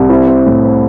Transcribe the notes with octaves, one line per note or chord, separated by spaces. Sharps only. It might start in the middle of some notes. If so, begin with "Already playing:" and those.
Already playing: C2
C4 E4
C4
A2
C4